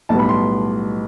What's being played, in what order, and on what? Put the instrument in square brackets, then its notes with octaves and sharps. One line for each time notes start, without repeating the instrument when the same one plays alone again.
[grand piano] B1 A2 G3 B3 A5
B5
C6